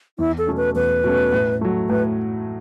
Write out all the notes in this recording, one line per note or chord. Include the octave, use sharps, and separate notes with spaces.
E2 E4
A4
B2 A3 C#4
B4
E2 B4
B2 A3 C#4
A2
F#3 A3
A2 B4